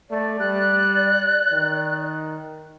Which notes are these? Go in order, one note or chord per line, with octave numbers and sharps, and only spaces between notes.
A3 D5
G3 F#6
D#3